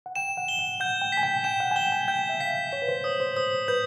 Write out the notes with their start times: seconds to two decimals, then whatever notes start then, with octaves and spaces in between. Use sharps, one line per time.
0.06 F#5
0.16 G5 E7
0.37 F#5
0.48 G7
0.59 F#5
0.80 F#5 G6
1.02 G5
1.12 B6
1.17 G#5
1.23 G5
1.44 G5 E7
1.60 F#5
1.71 G#5
1.76 G5 G7
1.92 G#5
2.08 G5 G6
2.29 E5
2.40 F5 B6
2.72 C#5 B6
2.82 B4
2.88 C5
3.04 C#5 D#6
3.20 C5
3.37 C5 D#6
3.68 B4 G6